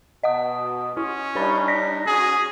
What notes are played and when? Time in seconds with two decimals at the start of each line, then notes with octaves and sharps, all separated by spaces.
0.23 B2 D#5 F#5 D#6
0.97 C#4 E4
1.36 G3 D4 D#4 G4 C#5 B5
1.68 A#6 B6
2.07 C#4 F#4 G#4